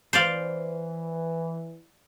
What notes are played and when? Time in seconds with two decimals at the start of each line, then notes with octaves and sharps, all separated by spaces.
0.13 E3 C5 D5 F5